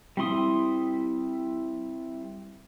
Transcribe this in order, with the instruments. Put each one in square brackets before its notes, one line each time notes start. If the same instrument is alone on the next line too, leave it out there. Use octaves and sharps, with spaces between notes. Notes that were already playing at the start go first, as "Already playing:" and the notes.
[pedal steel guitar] G3 C4 E4 C6 D#6